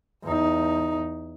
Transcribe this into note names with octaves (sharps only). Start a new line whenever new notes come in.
E2 D#4